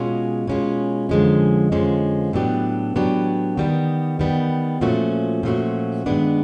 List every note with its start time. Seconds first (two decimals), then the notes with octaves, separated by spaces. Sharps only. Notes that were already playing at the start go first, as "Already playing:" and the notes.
Already playing: B2 G#3 C#4 F4
0.47 B2 G#3 C#4 F4
1.09 F2 D3 F3 G#3 C#4
1.72 F2 D3 F3 G#3 C#4
2.33 A2 F#3 B3 D4 G4
2.96 A2 F#3 B3 D4 G4
3.57 D#3 G3 B3
4.19 D#3 G3 B3
4.81 A#2 F3 A3 C#4 F#4
5.43 A#2 F3 A3 C#4 F#4
6.06 G2 D#3 G#3 B3 D4